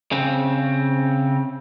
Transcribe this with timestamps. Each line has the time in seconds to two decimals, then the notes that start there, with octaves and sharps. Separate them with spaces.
0.12 C#3 C4